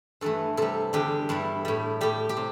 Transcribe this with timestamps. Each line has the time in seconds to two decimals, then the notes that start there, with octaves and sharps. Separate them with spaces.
0.21 G2 E3 A3 A4
0.57 C3 G3 A4
0.93 E2 D3 G3 G4
1.29 G2 G3 E4
1.65 A2 G3
2.01 A2 G3 G4
2.29 G4
2.37 C3